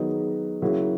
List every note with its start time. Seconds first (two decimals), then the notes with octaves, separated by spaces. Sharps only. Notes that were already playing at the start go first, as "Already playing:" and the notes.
Already playing: D#3 F#3 B3 D#4 G#4
0.62 C#3 F#3 A#3 E4